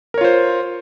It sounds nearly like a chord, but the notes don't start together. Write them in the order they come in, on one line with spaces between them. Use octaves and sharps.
A#4 C#5 F4 C5